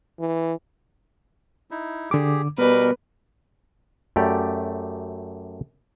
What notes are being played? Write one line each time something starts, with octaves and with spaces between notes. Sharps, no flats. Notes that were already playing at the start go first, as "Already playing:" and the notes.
E3
D#4 E4
D3 G4 G#4 D6
B2 G3 B3 A#4 B4
F#2 A3 G4 D5